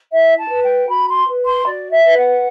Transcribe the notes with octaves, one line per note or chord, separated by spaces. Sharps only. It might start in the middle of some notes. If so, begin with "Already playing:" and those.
E4 E5
A5
B4
G5
F#4 B5
C6
B4
C6
F#4 D5
E5
B4
F#5